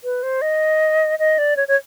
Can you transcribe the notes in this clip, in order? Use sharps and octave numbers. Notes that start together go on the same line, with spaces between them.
B4
C5
D#5
D#5
D5
C#5
C#5